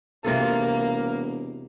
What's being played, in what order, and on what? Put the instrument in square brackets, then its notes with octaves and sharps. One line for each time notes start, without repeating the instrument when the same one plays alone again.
[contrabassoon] E1 [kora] C3 F4 A4 [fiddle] A#3